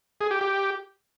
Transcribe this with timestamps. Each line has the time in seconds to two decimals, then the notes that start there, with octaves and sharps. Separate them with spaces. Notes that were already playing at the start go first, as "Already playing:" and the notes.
0.21 G#4
0.31 G4
0.41 G4